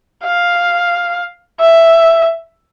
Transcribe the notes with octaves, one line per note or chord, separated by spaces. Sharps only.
F5
E5